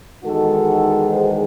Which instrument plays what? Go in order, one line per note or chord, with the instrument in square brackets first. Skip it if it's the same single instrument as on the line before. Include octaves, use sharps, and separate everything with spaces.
[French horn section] E2 D#3 G#3 D#4 F#4 A4
G#4 C5